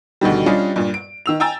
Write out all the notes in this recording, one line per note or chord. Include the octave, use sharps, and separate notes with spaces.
D2 B2 D#3 G3
G3 C#4 D4 F4 G4 D#5
G2 A#2
D7
D#3 E6 F7
G5 G#5 A#5 E6 A6